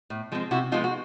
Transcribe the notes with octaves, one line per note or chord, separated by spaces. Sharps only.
A2
F3 G#3 C4
C3 E4 F#4
F3 G#3 B3 D#4 F4
F#4